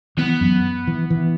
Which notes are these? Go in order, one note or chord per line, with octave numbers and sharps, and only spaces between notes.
E3 B3
F#2
E3
E3